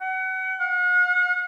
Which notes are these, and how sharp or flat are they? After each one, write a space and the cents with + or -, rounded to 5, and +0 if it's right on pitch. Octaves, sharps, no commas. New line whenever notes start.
F#5 +30
F#5 -40